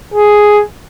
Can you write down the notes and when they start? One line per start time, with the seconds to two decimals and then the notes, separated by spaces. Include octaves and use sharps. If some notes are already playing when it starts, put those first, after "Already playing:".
0.14 G#4